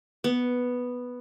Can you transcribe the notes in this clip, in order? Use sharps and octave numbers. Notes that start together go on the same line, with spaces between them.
B3